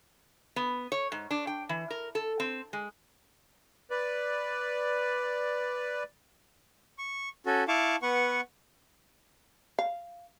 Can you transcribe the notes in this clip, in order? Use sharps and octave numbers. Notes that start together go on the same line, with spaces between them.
B3
C#5
G#2
D4
G5
E3
A#4
A4
C4
G#3
B4 D5
C#6
C#4 F#4 A4
E4 F5 A5 C#6 D6
B3 B4 F#5 C#6
F5